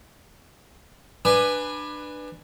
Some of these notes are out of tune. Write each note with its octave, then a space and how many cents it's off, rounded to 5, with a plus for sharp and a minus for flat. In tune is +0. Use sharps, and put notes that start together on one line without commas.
D4 +25 B4 +0 G#5 +0